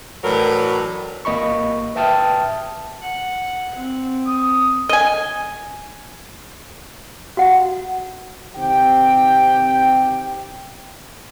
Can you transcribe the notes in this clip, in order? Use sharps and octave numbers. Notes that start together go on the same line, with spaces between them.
A2 E3 F#3 D4 A#4 B4
G#1 A#3 D#5 B5 C#6
B4 E5 G5 A5 D#6 F6
F#5
C4
D#6
D#5 G#5
F#4 F#5
C3 D#3 C4 G4 G5